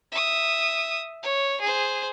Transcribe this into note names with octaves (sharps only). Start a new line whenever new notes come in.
E5 D#6
C#5
G#4 C5